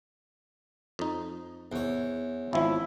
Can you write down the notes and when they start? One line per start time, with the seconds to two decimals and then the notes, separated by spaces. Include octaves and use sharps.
0.99 F2 D#4
1.72 E2 C#5
2.53 G#1 F3 E4